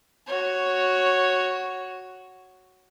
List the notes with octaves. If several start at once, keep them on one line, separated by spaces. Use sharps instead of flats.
F#4 C#5